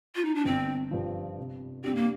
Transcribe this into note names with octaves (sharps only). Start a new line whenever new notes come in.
F4
D#4
D4
G1 C4
G2 F3
C3
G3 C4 D4 G4
A#3